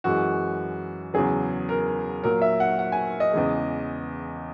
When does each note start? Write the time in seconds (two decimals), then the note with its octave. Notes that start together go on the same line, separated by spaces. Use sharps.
0.04 F#2 E3 G#3 F#4
1.14 E2 C#3 F#3 G#4
1.69 A#4
2.24 A#2 F#3 A#4
2.42 E5
2.60 F#5
2.79 F#5
2.92 G#5
3.20 D#5
3.33 E2 C#3 E3 G#3